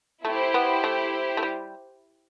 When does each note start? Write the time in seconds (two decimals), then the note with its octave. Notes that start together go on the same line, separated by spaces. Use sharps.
0.25 A3 E4 G4 C5
0.54 B3
0.84 A3
1.37 A3
1.43 G3